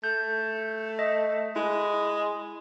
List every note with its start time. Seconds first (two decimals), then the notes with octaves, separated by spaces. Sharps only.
0.04 A3 G6
0.99 D#5 E5
1.56 G#3 E4